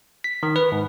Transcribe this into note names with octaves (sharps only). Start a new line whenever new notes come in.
B6
D#3
B4
G#2